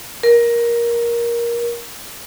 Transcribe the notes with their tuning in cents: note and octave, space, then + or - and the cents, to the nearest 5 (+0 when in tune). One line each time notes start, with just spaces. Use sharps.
A#4 +15